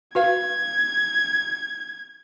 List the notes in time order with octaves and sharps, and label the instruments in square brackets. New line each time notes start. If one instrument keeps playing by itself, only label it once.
[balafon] F#4 B4 F5 [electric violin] G#6